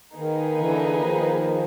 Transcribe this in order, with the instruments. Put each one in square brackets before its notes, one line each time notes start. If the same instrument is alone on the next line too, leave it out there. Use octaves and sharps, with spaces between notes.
[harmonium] D#3 [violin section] A#3 D#4 G#4 B4
[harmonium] D3 E3
D#3 F3